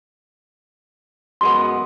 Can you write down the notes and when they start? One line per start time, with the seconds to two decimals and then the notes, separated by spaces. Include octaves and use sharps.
1.41 F#2 G#3 B3 C6